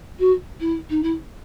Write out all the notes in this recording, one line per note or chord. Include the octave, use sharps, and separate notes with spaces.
F#4
E4
D#4
E4